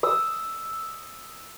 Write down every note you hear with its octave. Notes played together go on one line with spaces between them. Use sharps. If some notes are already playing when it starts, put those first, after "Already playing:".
D#6 E6